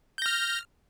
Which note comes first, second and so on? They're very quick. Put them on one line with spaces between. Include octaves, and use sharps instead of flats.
G6 A#6 F6